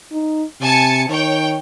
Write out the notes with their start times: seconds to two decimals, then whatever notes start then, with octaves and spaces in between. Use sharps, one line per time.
0.12 D#4
0.61 C3 G#5 A5 C#7
1.09 D#3 C#5 G5